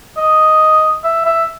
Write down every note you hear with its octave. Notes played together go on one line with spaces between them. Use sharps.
D#5
E5
E5